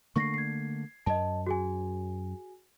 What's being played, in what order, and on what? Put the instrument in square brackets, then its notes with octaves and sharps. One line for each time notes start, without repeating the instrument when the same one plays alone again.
[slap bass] D3 A3 A#3 [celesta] C#6 A#6 C7
[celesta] G#6 C7
[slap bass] F#2 [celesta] D#5 A5
[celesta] F#4 G#4 G#5